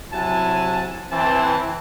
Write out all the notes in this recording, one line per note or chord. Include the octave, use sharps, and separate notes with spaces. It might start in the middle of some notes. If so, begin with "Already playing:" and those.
C3 F#3 E4 F#5 G#5 A5
E3 C4 A5